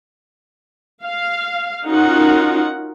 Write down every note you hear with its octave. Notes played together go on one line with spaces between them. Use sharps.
F5
C#4 D#4 F4 F#4 A#4 F#5